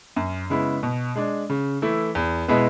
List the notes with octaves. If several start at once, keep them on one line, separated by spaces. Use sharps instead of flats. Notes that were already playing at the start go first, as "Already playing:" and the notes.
F#2
C#3 G#3 B3 E4
B2
G#3 D4
C#3
E3 A3 E4
E2
B2 G#3 B3 E4